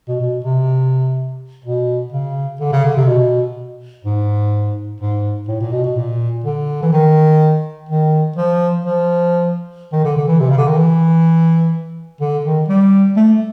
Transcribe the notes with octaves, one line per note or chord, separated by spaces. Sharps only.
B2
B2
C3
B2
C#3
D3
C#3
D3
C3
B2
G#2
G#2
A2
A#2
B2
B2
A#2
D3
E3
D#3
D#3
F3
F3
D#3
D3
D3
E3
C3
C#3
D3
D#3
E3
D3
D#3
G3
A3